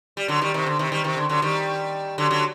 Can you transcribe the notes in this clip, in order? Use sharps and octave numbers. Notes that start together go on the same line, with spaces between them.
G3
D3 F#3
D#3 G3
C3 D#3
D3
C3 D#3
D#3 G3
C3 D#3
D3
D3 F#3
D#3 G3
D3 F#3
D3 F#3